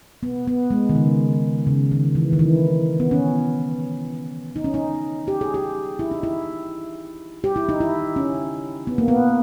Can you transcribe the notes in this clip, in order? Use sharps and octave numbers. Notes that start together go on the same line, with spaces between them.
B3
B3
G#3
D#3
C#3
C#3
D#3
E3
D#3
E3
B3
C#4
D#4
C#4
D#4
G4
G#4
G4
E4
D#4
E4
G4
E4
D#4
E4
C#4
B3
A#3
B3